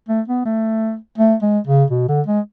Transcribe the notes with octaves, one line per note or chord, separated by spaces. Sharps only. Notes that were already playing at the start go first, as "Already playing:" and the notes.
A3
B3
A3
A3
G#3
C#3
B2
D3
G#3